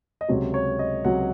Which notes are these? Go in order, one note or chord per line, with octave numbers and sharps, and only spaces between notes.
D#5
C#2 C3 F#3 C#5
C#5
D#5
C#2 C3 F#3 F#5